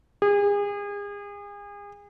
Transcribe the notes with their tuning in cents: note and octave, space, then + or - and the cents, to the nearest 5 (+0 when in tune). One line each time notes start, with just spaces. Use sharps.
G#4 -35